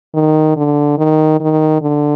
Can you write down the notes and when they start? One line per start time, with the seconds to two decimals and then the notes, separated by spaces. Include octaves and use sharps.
0.14 D#3
0.56 D3
0.98 D#3
1.41 D#3
1.82 D3